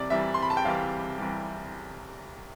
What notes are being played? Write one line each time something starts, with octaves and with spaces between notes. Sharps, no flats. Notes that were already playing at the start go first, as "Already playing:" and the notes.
Already playing: C2 C3 E3 G3 D5
C2 C3 E3 G3 E5
C6
B5
A5
G5
C2 C3 E3 G3 F5
C2 C3 E3 G3